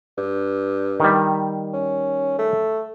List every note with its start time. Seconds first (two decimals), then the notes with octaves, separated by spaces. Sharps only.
0.18 G2
1.00 D#3 G3
1.73 C#4
2.39 A3